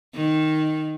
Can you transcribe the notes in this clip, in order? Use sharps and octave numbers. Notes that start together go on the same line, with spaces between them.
D#3